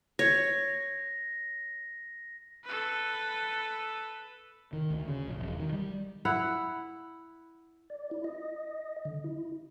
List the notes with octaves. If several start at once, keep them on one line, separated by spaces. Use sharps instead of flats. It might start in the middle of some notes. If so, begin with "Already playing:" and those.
C#5 A#6
A4 B4
D#3
D2
C#3
A#1
E1
D#3
G3
E4 F#5
D5
E4
D#5
D3
E4